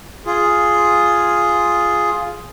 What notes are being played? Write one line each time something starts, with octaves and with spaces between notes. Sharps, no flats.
F4 G#4